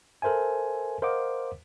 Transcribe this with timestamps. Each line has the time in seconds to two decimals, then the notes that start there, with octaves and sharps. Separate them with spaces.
0.22 A4 A#4 C5 E5 G#5
1.02 A#4 C5 D#5 F5 F#5 D6